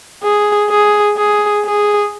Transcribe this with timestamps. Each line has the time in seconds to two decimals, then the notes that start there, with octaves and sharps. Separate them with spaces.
0.24 G#4
0.70 G#4
1.17 G#4
1.64 G#4